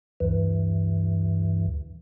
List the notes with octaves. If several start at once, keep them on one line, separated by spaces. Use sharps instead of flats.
D2 G2 E3